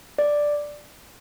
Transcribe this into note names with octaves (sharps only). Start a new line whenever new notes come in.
D5